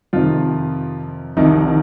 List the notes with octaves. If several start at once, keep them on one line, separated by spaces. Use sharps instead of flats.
F2 C3 D#3 F3 F4
C2 C3 D#3 F3 D#4
D#3